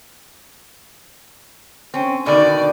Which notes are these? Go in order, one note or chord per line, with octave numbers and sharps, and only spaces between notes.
C4 C#4
B2 D3 D#3 D5